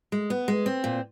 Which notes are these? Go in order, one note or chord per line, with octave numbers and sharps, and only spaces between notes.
G#3
B3
G#3
C4
A#2